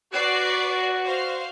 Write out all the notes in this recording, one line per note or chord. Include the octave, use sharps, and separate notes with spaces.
F#4 B4 D5 C7
C5 F5